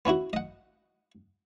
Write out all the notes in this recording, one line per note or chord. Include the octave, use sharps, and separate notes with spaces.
B3 C#4 E4 F#4
D#5 F#5